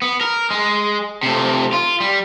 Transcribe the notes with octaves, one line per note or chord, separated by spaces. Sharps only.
B3
A#4
G#3
C3 A3
F4
G3